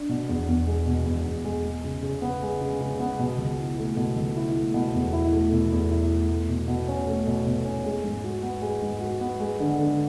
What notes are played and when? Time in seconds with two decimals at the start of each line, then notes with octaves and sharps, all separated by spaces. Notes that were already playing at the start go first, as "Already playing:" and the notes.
Already playing: D4
0.09 B2
0.29 E2
0.48 E2
0.67 G#3
0.87 B2
1.06 E2
1.25 E2
1.45 G#3
1.64 G#3
1.84 C#3
2.03 C#3
2.22 B3
2.42 G#3
2.61 C#3
2.81 C#3
3.00 B3
3.19 B2
3.38 C#2
3.59 E4
3.78 A3
3.97 B2
4.16 C#2
4.36 E4
4.56 A3
4.74 B2
4.94 E2
5.13 E4
5.33 A3
5.52 B2
5.72 E2
5.91 E4
6.11 A3
6.30 A3
6.49 B2
6.68 B2
6.88 C#4
7.07 A3
7.27 B2
7.47 B2
7.65 C#4
7.85 G#3
8.04 G#2
8.24 F#4
8.43 B3
8.62 G#3
8.82 G#2
9.01 F#4
9.21 B3
9.40 G#3
9.60 D3
9.79 D3